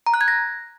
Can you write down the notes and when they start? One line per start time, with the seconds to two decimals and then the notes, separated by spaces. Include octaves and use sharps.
0.06 A#5
0.14 F#6
0.21 G#6
0.28 A#6